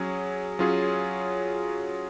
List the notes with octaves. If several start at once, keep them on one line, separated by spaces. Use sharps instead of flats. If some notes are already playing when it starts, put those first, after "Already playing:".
Already playing: F#3 C#4 G#4
F#3 C#4 F4 G#4